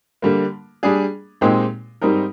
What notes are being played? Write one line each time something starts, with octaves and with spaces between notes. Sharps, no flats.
D3 G3 A#3
G3 D4 G#4
A#2 G#3 C4 D#4 G4
G#2 G3 C4 D#4 A#4